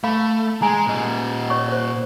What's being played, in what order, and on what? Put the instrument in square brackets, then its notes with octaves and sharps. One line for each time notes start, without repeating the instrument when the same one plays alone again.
[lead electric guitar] A3 [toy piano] F5 B5
[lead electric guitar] G#3 [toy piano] G#5 A#5
[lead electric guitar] A#2 D#5
[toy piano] C#5 C#6
C5 C#5